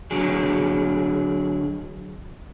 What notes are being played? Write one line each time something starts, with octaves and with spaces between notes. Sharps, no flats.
D3 F#3 G#4